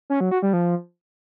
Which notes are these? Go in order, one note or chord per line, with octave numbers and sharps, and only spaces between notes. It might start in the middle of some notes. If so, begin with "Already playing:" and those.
C#4
F#3
F#4
G3
F3